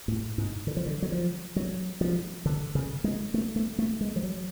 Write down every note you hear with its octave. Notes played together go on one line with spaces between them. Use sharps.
A2
G#2
D3
F3
D3
F#3
F3
F#3
F3
D3
C#3
G#3
A3
A3
A3
G#3
F3
F#3